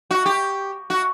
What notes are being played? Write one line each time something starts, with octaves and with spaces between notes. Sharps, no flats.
F#4
G4
F#4